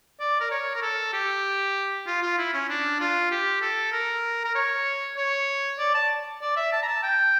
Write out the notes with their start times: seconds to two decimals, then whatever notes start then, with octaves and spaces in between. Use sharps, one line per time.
0.20 D5
0.40 A#4
0.51 C#5
0.75 A#4
0.82 A4
1.13 G4
2.07 F4
2.22 F4
2.38 E4
2.54 C#4
2.69 D4
3.00 F4
3.31 G4
3.62 A4
3.92 A#4
4.44 A#4
4.55 C#5
5.16 C#5
5.79 D5
5.94 A5
6.42 D5
6.56 E5
6.72 A5
6.82 A#5
6.87 A5
7.03 G5